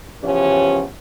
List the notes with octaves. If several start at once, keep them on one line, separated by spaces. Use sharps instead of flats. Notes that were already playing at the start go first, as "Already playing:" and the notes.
C#3 E3 F3 B3 C#4 G4